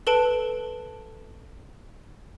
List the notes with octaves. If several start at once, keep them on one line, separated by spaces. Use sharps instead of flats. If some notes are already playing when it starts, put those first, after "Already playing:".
A4 B4 A5 D7